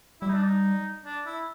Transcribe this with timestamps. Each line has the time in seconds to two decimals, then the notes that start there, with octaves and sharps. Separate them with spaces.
0.21 G3 E4
0.29 D#4
0.36 D4
0.44 D#4
1.05 D4
1.26 E4